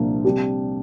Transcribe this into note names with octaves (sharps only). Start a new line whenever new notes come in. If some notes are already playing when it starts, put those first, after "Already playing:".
Already playing: C2 A#2 F3 A#3 D4
C3 G3 D4 G4